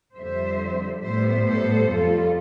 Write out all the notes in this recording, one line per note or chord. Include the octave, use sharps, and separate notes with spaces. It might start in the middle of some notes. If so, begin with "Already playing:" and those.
F2 D3 G3 C5 E5
A2 G3 B3 C5 E5
A4 C5
F2 C3 G3 F4 A4